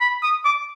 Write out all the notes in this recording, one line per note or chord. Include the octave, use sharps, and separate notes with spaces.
B5
D#6
D6